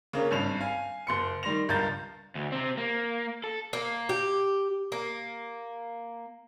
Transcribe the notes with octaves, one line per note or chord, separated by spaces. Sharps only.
C#3 A#3 C#4 D4
G#1 G2 F7
F5 G#5
F#1 C6 C#7
D#3 G3 C6 A#6 F7
C#2 G2 A#4 G6 A6
D2
C3 C4
A#3
A4
A#3
G4
A#3